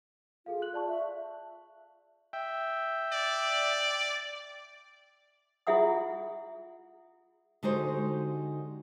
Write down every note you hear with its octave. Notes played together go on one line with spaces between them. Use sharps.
F4 G#4 A4 F5
F#6 F#7
D5 A5 C#6
E5
E5 G5
D5
E4 F4 G#4 E5 F#5 D#6
D3 G#3 D#4 F#4 G4 C5